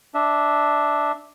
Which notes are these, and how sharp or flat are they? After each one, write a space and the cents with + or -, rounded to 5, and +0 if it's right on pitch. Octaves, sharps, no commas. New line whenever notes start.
D4 +0 E5 -15